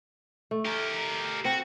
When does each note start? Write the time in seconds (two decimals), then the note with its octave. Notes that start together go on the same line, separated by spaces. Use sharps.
0.51 A3
0.66 G4 A#4
1.45 C4 F#4